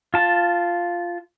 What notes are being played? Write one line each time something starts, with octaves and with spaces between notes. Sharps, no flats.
F4 A5